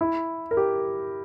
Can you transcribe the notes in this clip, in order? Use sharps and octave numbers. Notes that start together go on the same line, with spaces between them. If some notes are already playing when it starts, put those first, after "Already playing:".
E4
A#4
G4